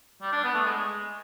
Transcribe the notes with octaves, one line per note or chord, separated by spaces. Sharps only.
G3
D4
B3
A3
G#3